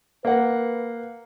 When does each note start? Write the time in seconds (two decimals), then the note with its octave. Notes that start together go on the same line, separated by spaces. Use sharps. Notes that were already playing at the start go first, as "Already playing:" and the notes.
0.25 A#3 B4 F#5